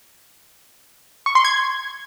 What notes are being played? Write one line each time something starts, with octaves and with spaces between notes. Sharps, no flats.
C#6
C6
G#6